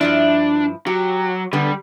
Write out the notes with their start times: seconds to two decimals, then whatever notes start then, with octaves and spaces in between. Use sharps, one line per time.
0.01 G2 F3 D4 E4
0.87 F#3 G4
1.53 D3 G3 B3